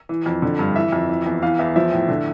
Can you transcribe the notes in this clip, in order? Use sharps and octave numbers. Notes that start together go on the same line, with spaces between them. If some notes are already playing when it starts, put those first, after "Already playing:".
E3
F2
D3
G2
E3 E5
F2
E3
E2
E3 F5
E2 E5
F3 E5
A2
D3